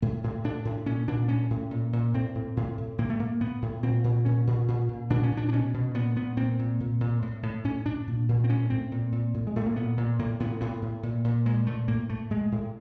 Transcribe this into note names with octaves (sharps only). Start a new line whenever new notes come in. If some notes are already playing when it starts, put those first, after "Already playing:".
A2 A3
A2
A2 D4
A2
A#2 C#4
A#2 D4
A2 C#4
A2
A#2
A#2
A2 C4
A2
A2
A2
A2 A#3
A3
A2 A#3
A2 B3
A2
A#2 C4
A#2
A#2 C#4
A#2
A#2
A#2
A#2 D4
C#4
A#2
D4
D4
B2 C#4
B2
A#2 B3
A#2 B3
A#2 C4
A#2
A#2
A#2
A2
A2
A2 C#4
A2 D4
A#2
A#2
C4
A2 C#4
A2 C4
A#2
A#2
A2
G#3
A2 A3
A#3
A#2 B3
A#2
A2 A#3
A2 B3
A2 B3
A2
A#2
A#2
A#2 G#3
A#2 A3
A2 A#3
A2 A3
A2 G#3
A2